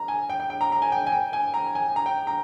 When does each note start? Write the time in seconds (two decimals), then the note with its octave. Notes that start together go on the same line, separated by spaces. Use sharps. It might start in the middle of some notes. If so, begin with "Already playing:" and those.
Already playing: A#5
0.08 G#5
0.30 G5
0.40 G5
0.50 G5
0.61 A#5
0.72 A#5
0.82 G#5
0.92 G5
1.07 G#5
1.12 G5
1.33 G#5
1.54 A#5
1.75 G#5
1.96 A#5
2.06 G5
2.27 A#5